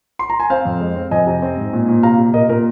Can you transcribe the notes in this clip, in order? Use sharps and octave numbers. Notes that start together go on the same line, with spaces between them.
C6
A#5
G#5
C4 C5 F5
F2
G#3
C4
F2 D#5 G#5
C3
C4
G#2
A#2
A#2
C3 F5 A#5
C3
A#2 A#4 D#5
A#2 A#4